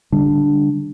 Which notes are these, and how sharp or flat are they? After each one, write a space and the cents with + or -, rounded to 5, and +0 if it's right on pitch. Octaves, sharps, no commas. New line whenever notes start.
D3 +0 G3 +15 D4 +0